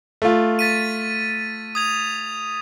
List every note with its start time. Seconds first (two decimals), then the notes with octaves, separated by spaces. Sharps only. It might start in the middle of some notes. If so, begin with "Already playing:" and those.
0.22 A3 F4
0.59 A6 B6 D#7
1.75 D#6 G#6 F7